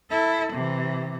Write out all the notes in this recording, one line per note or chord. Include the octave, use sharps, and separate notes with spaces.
E4 A4
C3 E3